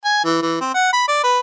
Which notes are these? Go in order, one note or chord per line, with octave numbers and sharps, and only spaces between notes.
G#5
E3
E3
C4
F#5
B5
D5
B4